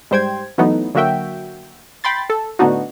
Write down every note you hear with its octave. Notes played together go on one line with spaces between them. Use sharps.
G#2 G3 C5 G5 G#6
E3 F#3 A3 B3 D#4
D3 F#3 A#3 F#4 E5 G5
G5 B5 C6 A6
A4
A2 D3 B3 D4 D#4 F#4